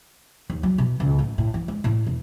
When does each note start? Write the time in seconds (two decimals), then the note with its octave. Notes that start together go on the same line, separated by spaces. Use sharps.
0.50 D#2
0.63 F#3
0.78 B2
1.00 C#2
1.19 A2
1.38 A2
1.54 E3
1.68 G#3
1.84 A2
2.07 E1